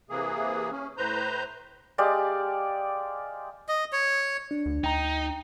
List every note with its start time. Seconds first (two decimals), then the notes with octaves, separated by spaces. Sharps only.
0.10 C3 E3 A#3 G#4
0.71 C#4
0.97 A2 B4 C5 A#5 G6
1.98 G#3 G4 D5 F5
3.68 D#5
3.93 C#5
4.51 D4
4.66 D2
4.84 D2 D#4 G5 A#5